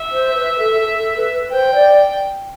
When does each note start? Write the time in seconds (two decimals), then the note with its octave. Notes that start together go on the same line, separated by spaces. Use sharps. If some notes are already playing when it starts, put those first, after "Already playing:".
Already playing: E5
0.12 C5
0.35 B4
0.58 A4
0.81 A4
0.99 A4
1.16 B4
1.34 B4
1.52 C5 G5
1.75 D5